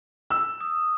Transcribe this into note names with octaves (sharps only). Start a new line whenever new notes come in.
E6
D#6